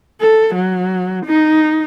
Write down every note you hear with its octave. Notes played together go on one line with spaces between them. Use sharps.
A4
F#3
D#4